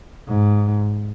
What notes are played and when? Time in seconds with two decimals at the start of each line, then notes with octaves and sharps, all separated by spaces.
0.28 G#2